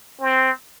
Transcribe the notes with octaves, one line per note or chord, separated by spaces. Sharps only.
C4